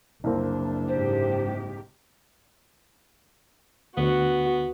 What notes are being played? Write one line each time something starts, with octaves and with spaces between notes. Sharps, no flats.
F#1 C2 A#3 C4 D4
G#2 C3 G4 C5
D2 B3 F#4